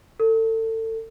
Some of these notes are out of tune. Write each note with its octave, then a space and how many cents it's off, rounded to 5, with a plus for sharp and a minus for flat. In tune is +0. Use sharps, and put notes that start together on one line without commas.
A4 +30